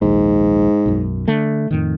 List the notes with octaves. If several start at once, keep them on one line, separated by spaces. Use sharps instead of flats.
A#1 D#2 G#2
B1 F#2
D3 A3
F2 A2 D#3